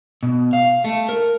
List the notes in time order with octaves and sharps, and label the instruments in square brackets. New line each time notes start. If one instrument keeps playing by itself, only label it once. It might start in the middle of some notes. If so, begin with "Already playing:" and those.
[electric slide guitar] B2
F5
A3
A#4